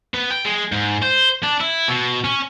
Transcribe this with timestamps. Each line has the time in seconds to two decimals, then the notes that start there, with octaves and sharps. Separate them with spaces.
0.14 B3
0.30 G5
0.45 G#3
0.72 G#2
1.02 C5
1.43 D4
1.60 E4
1.88 B2
2.24 C#4